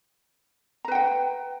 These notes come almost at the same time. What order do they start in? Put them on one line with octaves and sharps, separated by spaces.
A#5 B4 G5 F#5